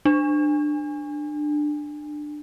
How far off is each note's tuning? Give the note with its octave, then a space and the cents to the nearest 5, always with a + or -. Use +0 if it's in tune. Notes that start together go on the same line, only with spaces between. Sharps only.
D4 +20